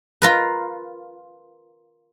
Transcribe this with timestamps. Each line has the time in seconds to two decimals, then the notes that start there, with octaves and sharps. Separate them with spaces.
0.22 F4 A#4 B4